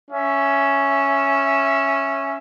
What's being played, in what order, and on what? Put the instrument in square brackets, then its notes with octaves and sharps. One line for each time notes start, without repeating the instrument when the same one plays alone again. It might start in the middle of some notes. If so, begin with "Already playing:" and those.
[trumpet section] C#4 E5